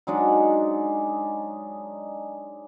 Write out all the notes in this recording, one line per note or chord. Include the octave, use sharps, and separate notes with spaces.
F#3 G#3 D4 D#4